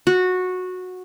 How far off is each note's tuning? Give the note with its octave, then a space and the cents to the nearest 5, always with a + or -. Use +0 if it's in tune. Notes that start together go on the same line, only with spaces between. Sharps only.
F#4 -15